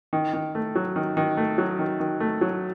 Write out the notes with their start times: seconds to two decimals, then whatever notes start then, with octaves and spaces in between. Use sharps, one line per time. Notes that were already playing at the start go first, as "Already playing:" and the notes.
0.13 D#3
0.33 D#3
0.55 A3
0.75 F#3
0.96 D#3
1.17 D#3
1.37 A3
1.58 F#3
1.79 D#3
2.00 D#3
2.20 A3
2.41 F#3